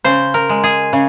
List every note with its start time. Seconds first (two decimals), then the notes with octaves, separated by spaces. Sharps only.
0.04 C#3 C5
0.34 A#4
0.49 G#3
0.64 G#4
0.93 C#3